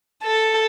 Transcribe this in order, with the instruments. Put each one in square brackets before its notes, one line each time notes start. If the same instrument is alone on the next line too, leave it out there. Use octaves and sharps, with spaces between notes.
[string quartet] A4